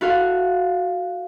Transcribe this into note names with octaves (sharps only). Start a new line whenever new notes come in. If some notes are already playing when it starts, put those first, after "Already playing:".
E4 F#4 A4 F5